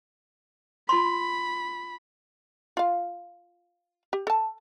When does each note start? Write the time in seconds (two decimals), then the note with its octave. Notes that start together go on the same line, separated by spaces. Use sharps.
0.89 F4 B5 C6
2.77 F4 F5
4.13 G4
4.27 A4 A5